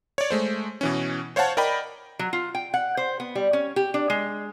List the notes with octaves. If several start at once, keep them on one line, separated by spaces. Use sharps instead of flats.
C#5 D5
G#3 A3 C5
B2 E3 C#4
C5 C#5 F5 F#5 A5
A#4 D5 D#5 G5 B5
F#3
F4
G5
F#5
C5
B3
G3
C#4
G4
D4
G#3